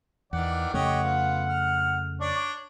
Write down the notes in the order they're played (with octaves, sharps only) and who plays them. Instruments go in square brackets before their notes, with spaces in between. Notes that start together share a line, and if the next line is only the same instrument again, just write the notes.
[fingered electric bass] E2 [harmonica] D#3 E3 D5 [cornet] F#5
[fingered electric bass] F2 C#3 A3 [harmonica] G4 C#5 D#5 [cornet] F#5
[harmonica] B3 F4
F6
[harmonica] D4 C#5 C#6 [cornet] D5